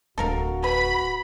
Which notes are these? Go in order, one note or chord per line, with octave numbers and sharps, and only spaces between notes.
D1 D4 F#4 A4 A#4 F5
B4 B5